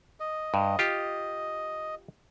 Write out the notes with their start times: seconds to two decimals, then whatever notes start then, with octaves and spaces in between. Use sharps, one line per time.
0.20 D#5
0.54 G2
0.79 F4 G4